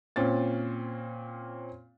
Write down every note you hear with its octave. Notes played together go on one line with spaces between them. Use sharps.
A#2 C4 C#4 A6